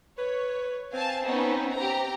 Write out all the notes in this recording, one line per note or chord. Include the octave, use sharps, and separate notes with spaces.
B4 C#5
C4 F5 G#5 A5
B3 C#4 D#4
C4 G4 A#5